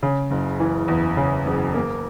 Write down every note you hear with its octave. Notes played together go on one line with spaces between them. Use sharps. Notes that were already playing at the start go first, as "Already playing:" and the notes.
C#3
F#1
E3
E2
C#3
F#1
A#3